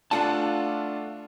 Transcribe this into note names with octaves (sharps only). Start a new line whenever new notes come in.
A3 D4 F4 F5 F#5 A5